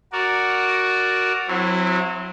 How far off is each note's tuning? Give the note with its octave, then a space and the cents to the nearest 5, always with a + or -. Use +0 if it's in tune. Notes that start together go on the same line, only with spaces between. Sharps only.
F#4 +5 A#4 +0 D5 +0
F#3 -25 C4 +0 E4 +5